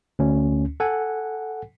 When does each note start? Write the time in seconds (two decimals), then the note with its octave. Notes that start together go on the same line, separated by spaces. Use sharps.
0.19 D2 C#4
0.80 A4 F#5 G#5